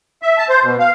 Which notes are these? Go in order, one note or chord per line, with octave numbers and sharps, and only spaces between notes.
E5
A5
C5
B2
F5